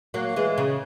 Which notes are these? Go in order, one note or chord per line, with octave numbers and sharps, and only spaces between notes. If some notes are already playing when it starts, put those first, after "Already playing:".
F#3 A#3
E3 G#3
C#3